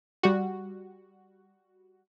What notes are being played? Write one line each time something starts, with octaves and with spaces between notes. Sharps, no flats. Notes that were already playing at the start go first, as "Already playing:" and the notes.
G3 F#4